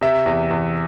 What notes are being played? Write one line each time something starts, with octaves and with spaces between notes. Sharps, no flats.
C3 E5
E2
E2